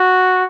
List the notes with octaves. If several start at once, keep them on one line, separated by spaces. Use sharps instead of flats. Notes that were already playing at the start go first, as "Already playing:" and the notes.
Already playing: F#4